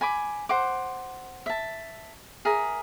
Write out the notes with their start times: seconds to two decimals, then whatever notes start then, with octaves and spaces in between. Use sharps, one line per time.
0.01 G#5 B5 D6
0.49 C5 F#5 D6
1.46 E5 A5
2.45 G#4 A#4 E5